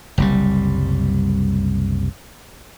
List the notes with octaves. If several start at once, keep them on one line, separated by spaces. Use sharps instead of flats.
F#1 C2 G3